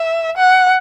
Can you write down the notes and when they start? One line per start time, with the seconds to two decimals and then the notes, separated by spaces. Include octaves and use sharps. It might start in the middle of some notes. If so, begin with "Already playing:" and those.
Already playing: E5
0.37 F#5